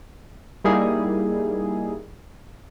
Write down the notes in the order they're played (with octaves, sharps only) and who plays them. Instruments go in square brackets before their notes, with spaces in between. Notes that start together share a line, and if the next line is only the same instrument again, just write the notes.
[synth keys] G3 A#3 D#4 E4 G#4